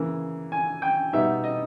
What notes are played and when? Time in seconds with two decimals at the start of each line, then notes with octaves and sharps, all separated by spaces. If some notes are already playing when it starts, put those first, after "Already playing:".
Already playing: C#3 E3 A#3
0.52 G#5
0.82 G5
1.13 B2 G3 B3 D#4 E5
1.44 D#5